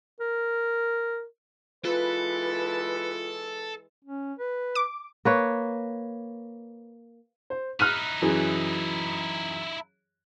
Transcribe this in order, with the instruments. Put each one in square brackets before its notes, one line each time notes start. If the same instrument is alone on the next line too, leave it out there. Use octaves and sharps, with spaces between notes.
[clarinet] A#4
[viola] E3 G#3 [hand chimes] F4 [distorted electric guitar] A4 [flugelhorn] B4
[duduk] C#4
B4
[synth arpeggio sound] D6
[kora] A#3 B4 C#5
[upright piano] C5
[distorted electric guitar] D#4 E4 [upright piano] F6 F#6 D#7
[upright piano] F#2 E3 G#4